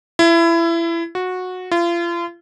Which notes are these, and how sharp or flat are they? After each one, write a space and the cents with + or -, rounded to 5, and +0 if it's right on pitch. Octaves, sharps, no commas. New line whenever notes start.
E4 +25
F#4 -15
F4 -35